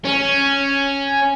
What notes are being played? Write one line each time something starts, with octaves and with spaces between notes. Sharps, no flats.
C#4